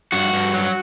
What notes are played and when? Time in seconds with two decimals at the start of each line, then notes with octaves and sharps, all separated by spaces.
0.12 G2 F#4
0.33 G2
0.54 F#3